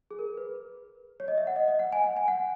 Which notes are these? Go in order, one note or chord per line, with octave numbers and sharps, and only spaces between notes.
G#4
A#4
B4
C#5
D#5
E5
F#5
D#5
D#5
F#5
G#5
F#5
G#5
F#5